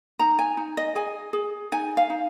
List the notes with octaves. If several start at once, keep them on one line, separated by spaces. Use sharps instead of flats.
D#4 A#5
G#5
D#4
D#5
G#4 G#5
G#4
D#4 G#5
F5
D#4